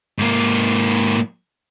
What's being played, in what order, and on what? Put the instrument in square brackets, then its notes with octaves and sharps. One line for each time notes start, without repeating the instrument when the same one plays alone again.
[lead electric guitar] G#2 A#3